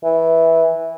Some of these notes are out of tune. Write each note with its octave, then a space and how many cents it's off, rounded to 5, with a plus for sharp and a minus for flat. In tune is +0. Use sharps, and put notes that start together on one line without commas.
E3 -10